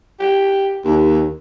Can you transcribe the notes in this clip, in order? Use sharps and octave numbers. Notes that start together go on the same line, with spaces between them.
G4
D#2